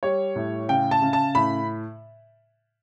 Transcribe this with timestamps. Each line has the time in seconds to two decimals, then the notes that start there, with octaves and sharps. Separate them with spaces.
0.03 G3 C#5
0.36 A2
0.69 C#3 G5
0.91 A5
1.02 C#3
1.13 A5
1.35 A2 B5